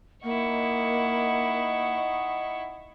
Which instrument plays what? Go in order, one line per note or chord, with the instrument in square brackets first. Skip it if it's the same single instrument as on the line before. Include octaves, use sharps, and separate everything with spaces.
[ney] A#3 [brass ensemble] D#4 D#5 F#5 [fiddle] E4 C#6